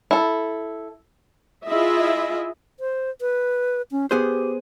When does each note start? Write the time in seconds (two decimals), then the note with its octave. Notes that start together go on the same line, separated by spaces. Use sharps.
0.11 E4 A4
1.65 E4 F4 G#4 D#5 E5
2.80 C5
3.21 B4
3.92 C#4
4.11 B3 G4 G#4 C5